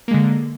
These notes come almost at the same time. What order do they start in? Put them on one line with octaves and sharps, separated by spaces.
A#3 G#3 D3